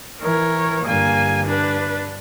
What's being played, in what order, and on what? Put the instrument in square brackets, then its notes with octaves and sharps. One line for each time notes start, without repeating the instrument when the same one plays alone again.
[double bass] E3 [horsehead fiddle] A#4 C#5
[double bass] G2 D3 [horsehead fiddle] A#3 G#5
[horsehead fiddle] D4 B4